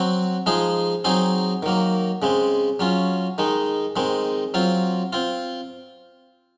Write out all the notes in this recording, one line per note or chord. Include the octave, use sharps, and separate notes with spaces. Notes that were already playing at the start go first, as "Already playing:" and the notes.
Already playing: F#3 C4 F#4
F3 G#3 D#4 G#4
F#3 C4 D#4 G#4
D#3 F#3 A#3
C#3 G#3 C4
F#3 C#4 F4
D#3 G#3 D#4
D#3 G#3 C4
F#3 C4 F4
C4 F4